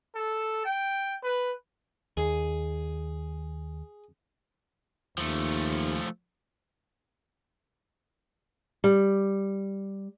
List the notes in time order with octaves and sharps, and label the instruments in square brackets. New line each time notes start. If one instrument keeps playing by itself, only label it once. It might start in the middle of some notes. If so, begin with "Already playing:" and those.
[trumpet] A4
G5
B4
[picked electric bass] D#2 [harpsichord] G#4
[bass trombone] D#2 [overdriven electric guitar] F3 A3
[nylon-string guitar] G3